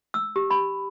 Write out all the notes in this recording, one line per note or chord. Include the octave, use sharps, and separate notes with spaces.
E6
G4
B5